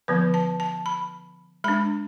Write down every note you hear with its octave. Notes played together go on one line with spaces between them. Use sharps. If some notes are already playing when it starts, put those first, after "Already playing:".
D3 F3 B3 B4
A5
A5
B5
G#3 D4 B5